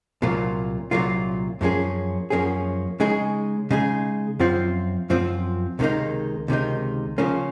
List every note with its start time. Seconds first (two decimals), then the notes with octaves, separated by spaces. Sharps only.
0.22 C2 A#2 F#3 A#3 F4
0.91 C2 A#2 F#3 A#3 F4
1.61 F#2 F3 A#3 C#4 G#4
2.30 F#2 F3 A#3 C#4 G#4
3.00 C#3 G#3 D#4 G#4
3.71 C#3 G#3 D#4 G#4
4.40 F#2 F3 C4 F4
5.10 F#2 F3 C4 F4
5.79 C#2 C3 D#3 A#3 D#4
6.48 C#2 C3 D#3 A#3 D#4
7.18 C#3 F3 A#3 C#4